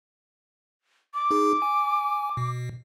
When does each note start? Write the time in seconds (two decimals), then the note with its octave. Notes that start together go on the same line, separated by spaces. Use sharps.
1.14 D6
1.31 D#4 G#4
1.62 G#5
2.37 B2